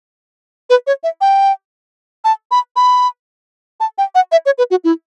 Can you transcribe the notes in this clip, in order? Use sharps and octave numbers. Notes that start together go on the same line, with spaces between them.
B4
C#5
E5
G5
A5
B5
B5
A5
G5
F#5
E5
C#5
B4
F#4
E4